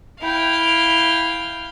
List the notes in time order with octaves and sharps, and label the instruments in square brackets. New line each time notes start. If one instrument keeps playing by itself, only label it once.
[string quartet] E4 [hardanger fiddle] F5 G5